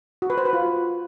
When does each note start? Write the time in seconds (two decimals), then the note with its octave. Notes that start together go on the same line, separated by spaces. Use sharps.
0.22 F#4
0.30 B4
0.38 C5
0.45 B4
0.53 F4